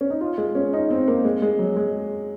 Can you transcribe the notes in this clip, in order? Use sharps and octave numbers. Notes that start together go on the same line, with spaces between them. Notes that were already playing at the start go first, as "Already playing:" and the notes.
C#4
D#4
F4
G#3
C#4
D#4
C4
A#3
G#3
G#3
F#3
G#3